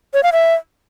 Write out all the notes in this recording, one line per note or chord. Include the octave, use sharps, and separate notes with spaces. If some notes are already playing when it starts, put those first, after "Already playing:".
C#5
F5
E5